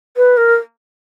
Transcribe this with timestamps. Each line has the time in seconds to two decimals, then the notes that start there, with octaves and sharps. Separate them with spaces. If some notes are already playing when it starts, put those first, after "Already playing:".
0.17 B4
0.37 A#4